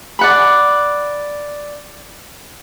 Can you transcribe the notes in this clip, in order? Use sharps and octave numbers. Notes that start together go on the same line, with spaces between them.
D5 F#5 B5